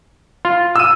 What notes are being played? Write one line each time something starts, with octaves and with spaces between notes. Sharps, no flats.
F4
E6 D#7